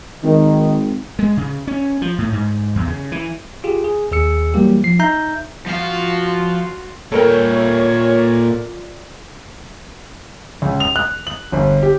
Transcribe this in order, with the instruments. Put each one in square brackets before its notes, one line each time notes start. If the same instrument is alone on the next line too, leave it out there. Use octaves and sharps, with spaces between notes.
[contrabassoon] G#1 [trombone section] D#3
[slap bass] G#3
C#3
C#4
F3
A2
G#2
E2
C#3
E3
[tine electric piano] F4 G4 G#4
G#4
D#2 G#4 E6 C#7
E3 F#3 G3 A#3 G4
F3 C7
D#4 E5 A#5 G6
[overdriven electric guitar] F3 F5 [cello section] F4 F#4
[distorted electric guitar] A#2 G5 [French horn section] F4 D5 [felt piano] A4 A#4 [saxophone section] C#5
[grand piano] C#2
F7
F#6
F#7
G1
G4